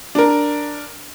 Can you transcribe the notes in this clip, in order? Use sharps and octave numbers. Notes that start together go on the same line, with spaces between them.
D4 A#4